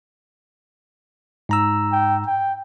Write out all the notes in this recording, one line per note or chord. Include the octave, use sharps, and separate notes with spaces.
G#2 A#5 E6
G5
G5